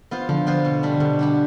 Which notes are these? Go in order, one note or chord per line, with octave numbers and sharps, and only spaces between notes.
B3 F4 C5
D3 F3
B3 F4 C5
B2
G3 D4 G4
B2 D3
G3 D4 G4